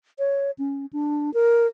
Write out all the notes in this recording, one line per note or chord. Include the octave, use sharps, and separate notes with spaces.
C#5
C#4
D4
A#4